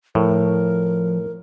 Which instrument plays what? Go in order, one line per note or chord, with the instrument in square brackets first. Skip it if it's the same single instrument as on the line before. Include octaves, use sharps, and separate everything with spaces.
[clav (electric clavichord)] A2 [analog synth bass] F3 [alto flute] A#4